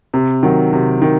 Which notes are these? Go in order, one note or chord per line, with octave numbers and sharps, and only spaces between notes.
C3
D#3 F#3
C3
D#3